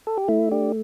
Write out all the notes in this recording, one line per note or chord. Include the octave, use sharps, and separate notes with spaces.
A4
G4
A3 E4
D4 G4